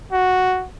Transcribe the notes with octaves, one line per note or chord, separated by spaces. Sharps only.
F#4